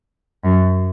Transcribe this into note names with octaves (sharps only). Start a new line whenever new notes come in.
F#2